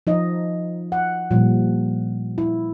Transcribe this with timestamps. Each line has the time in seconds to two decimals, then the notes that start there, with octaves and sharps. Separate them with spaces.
0.07 F3 D#4 D#5
0.92 F#5
1.31 A#2 F3 G3
2.38 E4